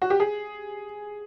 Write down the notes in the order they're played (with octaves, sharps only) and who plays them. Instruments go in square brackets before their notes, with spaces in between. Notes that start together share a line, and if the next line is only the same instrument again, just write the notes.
[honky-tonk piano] F#4
G4
G#4